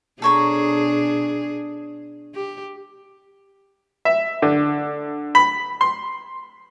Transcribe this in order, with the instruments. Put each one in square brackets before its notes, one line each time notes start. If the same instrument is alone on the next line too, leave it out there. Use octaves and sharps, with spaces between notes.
[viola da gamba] B2 D4 G#4 [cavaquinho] A4 C#5 A#5
[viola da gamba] G4
[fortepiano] E5
D3
B5
C6